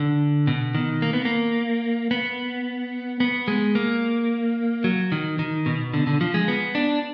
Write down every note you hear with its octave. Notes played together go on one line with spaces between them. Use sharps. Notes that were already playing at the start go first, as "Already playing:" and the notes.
Already playing: D3
B2
D#3
A#3
B3
A#3
B3
B3
G#3
A#3
F#3
D#3
D#3
B2
D3
D3
F3
G#3
B3
D4